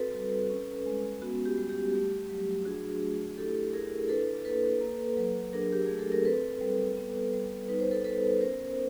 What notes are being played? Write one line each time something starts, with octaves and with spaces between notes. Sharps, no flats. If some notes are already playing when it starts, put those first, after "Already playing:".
Already playing: C4 F#4 A4 B4
G3
C#4
G#3
B3 F#4
G4
G3
G4
A3 G4
F#3
D4 F#4 G#4
A3
E4 G4 A4
E4 G#4 A#4
D4 A4 B4
A#3 A4 B4
A#3
F#3
D4 G#4 A#4
G4
A3 G#4
A4
A#4
C4 A4 B4
G3
B3
G3
D#4 B4
C5
A4 B4
B3 A4 B4
C#4 A#4 C5